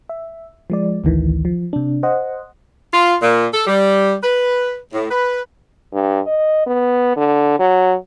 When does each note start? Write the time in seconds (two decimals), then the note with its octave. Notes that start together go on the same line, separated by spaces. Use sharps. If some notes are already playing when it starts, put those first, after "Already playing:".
0.09 E5
0.70 F3 G#3 D5
1.04 A1 D2 D#3 E3
1.45 F3
1.73 C3 D4
2.03 C5 D#5 F#5
2.93 F4
3.22 A#2
3.53 A4
3.67 G3
4.23 B4
4.92 A2
5.11 B4
5.93 G2
6.27 D#5
6.67 B3
7.17 D3
7.59 F#3